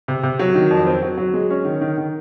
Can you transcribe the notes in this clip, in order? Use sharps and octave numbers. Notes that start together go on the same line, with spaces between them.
C3
C3
F#3
D#3
F2
C4
F#3
F#3
G#3
C#4
D#3
D#3
D#3